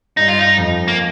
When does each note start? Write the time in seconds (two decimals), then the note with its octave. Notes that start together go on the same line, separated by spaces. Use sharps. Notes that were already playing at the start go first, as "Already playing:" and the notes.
0.17 G2 D#4
0.28 F4
0.39 D#4
0.57 F2
0.88 A#3